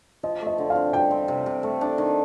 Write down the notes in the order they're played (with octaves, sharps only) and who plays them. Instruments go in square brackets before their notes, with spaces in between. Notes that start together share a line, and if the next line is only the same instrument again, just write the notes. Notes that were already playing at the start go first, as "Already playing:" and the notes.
[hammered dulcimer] F3 [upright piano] D#5
[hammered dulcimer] A3
[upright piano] D#5
[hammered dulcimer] D3
[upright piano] F5
[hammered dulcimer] C4
[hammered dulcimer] G3 [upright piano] G5
[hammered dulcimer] C4
C3
C3
A3
D4
D#3